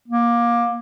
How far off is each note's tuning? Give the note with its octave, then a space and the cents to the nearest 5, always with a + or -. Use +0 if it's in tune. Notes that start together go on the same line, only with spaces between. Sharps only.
A#3 +20